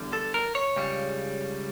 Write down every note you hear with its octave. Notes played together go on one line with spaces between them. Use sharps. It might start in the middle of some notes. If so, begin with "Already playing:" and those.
Already playing: E2 D3 G3
A4
A#4
C#5
C#2 C#3 G3